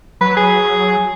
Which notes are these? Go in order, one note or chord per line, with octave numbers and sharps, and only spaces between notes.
F#3 B4
G#4